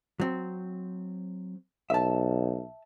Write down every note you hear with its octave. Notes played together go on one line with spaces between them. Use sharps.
F#3 C4
B1 E5 A5